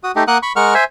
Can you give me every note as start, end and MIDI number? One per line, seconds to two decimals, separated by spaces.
0.04 0.12 66
0.04 0.12 87
0.16 0.24 57
0.16 0.24 63
0.16 0.24 67
0.28 0.38 58
0.28 0.38 70
0.28 0.38 78
0.28 0.38 87
0.28 0.38 90
0.43 0.53 83
0.43 0.53 85
0.56 0.74 56
0.56 0.74 70
0.56 0.74 78
0.56 0.74 85
0.56 0.74 89
0.74 0.84 72
0.74 0.84 76
0.74 0.84 80